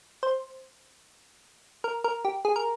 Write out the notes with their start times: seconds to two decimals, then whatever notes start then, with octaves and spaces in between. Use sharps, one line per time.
0.23 C5
1.84 A#4
2.04 A#4
2.25 G4
2.45 G#4
2.56 A#4